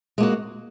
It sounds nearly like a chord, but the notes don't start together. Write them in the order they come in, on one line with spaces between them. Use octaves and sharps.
G#3 A#3 F#4